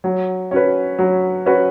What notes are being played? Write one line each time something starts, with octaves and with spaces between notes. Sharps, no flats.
F#3
C#4 F#4 B4
F#3
C#4 F#4 B4